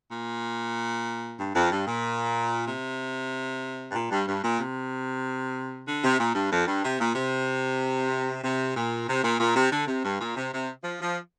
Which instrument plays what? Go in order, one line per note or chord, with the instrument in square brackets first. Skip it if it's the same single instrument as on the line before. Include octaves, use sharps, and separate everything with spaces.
[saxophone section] A#2
G2
F2
G2
A#2
C3
G2
A#2
G2
G2
A#2
C3
D3
C3
A#2
G2
F2
G2
C3
A#2
C3
C3
A#2
C3
A#2
A#2
C3
D3
C3
G2
A#2
C3
C3
F3
F3